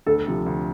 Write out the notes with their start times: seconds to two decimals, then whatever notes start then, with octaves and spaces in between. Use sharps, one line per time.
0.06 D2 A4
0.27 C3 F3
0.46 D2